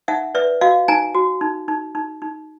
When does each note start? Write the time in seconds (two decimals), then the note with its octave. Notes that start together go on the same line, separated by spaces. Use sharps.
0.08 D#4 E5 F#5
0.35 B4 D5 E5
0.61 F#4 D#5 F5
0.88 D#4 G#5 A#5
1.15 F#4
1.41 D#4
1.68 D#4
1.95 D#4
2.22 D#4